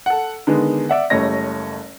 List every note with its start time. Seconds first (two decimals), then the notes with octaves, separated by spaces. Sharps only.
0.06 A4 F#5
0.47 D3 D#3 G#3 B3
0.89 D5 E5 F#5
1.10 F#1 G3 A3 C#5 D#5 A#6